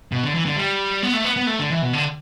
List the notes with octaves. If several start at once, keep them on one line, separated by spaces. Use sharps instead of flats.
B2
D3
E3
D3
G3
B3
A3
B3
B3
A3
D3
E3
B2
D3